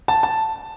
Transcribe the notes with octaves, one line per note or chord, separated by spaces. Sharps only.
A5
A5